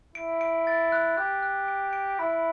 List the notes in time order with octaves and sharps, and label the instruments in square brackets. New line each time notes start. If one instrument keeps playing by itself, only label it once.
[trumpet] E4 [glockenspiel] D7
[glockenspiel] D7
A6
F#6
[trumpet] G4 [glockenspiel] F#6
[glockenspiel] F#6
D7
D7
[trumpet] E4 [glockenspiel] B5